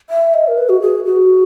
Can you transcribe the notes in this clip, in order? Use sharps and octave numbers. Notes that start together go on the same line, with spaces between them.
E5
D#5
A#4
B4
F#4
G#4
F#4